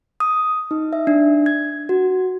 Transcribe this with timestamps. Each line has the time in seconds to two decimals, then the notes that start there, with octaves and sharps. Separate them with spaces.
0.20 D#6
0.71 D#4
0.93 E5
1.07 D4
1.46 G#6
1.89 F#4